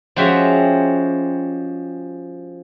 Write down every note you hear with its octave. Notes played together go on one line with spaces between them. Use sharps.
F3 G#3 C#4 F#4 G4 E5